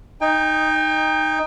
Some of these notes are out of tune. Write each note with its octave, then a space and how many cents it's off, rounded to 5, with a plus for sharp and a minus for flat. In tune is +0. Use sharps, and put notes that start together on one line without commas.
D#4 +0 G5 +35